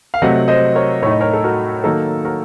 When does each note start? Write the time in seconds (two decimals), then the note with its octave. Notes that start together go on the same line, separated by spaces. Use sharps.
0.14 F5
0.22 C3 F#3 A3 C4 D#5 F#5
0.48 C5 D#5
0.75 A#4 C#5
1.02 A2 A3 D#4 C#5
1.11 D#5
1.21 A#4 C#5
1.33 A4
1.44 F#4 A#4
1.84 D#3 F#3 A#3 D#4 A4
2.25 F#4 A#4